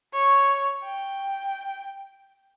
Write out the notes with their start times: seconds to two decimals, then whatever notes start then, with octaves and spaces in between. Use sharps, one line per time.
0.14 C#5
0.85 G5